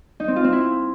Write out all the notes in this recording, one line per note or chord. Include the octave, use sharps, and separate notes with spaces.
D#4
C4
F4
C4
E4